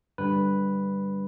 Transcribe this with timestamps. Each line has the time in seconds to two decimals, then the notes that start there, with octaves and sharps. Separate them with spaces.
0.18 G2 D3 G3 B4